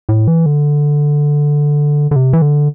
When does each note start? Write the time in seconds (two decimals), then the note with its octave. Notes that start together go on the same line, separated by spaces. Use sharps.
0.09 A2
0.28 E3
0.46 D3
2.11 D3
2.16 C3
2.33 E3
2.42 D3